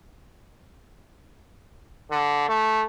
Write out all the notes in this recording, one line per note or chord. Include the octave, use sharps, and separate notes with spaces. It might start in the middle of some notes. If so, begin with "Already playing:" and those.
D3
A3